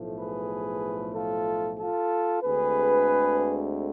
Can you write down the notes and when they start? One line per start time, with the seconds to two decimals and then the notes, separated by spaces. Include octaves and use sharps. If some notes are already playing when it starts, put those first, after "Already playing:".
Already playing: B1 A2 F3 A3
0.21 G#4 B4
1.15 F4 A4
1.79 F4 A4
2.42 D2 D3 G#3 C4 G#4 B4